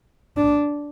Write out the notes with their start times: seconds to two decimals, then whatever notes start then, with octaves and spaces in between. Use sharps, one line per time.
0.37 D4